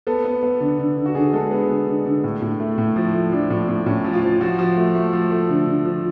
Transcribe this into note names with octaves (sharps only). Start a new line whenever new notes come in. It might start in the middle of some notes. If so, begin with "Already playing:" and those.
B3 A4
B3
B3
D3
D3
D3
F#4
D3 G#4
G#3 A4
B3 G#4
D3
D3
D3
A2
A2
A3
A2
F3
A3
F3 D4
A2
A2
A2 C#4
F3
F4
F3
F3 F#4
F3
A3
A3
F3
A3
D3
D3
F3